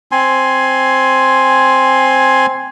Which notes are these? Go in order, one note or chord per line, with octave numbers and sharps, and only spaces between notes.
C4 G#5 C6